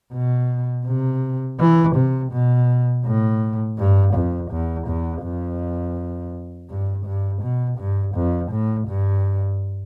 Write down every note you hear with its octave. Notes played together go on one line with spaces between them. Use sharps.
B2
C3
E3
C3
B2
A2
G2
F2
E2
E2
F2
G2
G2
B2
G2
F2
A2
G2